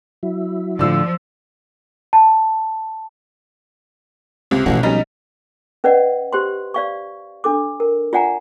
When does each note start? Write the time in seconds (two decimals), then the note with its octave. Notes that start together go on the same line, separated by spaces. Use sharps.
0.23 F#3 E4
0.79 A2 D3 F3 D5 E6
2.13 A5
4.51 C#2 C3
4.66 A1 B2 F3 F#4
4.83 B1 G3 C#4 D#4
5.84 C#4 B4 D5 D#5 F#5
6.33 G4 C5 C6
6.74 D5 F5 C#6
7.44 D4 A4 D6
7.80 A#4
8.13 F4 D5 F#5 G#5 A#5